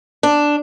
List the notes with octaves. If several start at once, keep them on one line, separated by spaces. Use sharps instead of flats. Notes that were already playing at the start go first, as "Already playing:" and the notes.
D4